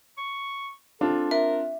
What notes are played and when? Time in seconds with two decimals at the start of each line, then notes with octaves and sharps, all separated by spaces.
0.18 C#6
1.01 C4 D4 F4 A4
1.31 A#4 E5